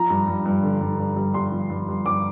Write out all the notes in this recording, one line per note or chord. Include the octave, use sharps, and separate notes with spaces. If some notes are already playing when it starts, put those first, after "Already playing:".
Already playing: F3 A#5
G2
G2
G2
D3
G2
G2
G2
G2 C6
F3
G2
G2
G2 D6